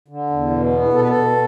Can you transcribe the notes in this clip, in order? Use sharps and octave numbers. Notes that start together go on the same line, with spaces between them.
D3
E2
B2
B3
B2 A4
B4
A4
B2